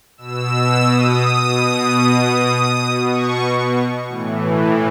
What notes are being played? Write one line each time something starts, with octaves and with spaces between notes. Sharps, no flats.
B2 E6
D#6
B2
B2
C#6
A2 E3